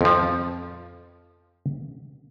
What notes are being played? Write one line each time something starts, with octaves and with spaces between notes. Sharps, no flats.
F2 F3